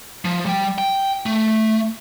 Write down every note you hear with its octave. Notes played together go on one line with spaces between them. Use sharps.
F3
G3 G5
G5
A3